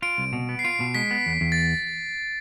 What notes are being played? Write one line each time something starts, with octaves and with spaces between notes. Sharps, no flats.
F4 D7
C2
B2
B3
C7
F4 D7
B2
G#3 B6
B3
E2
E2
A6